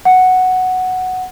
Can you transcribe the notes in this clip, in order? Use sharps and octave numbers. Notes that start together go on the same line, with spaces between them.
F#5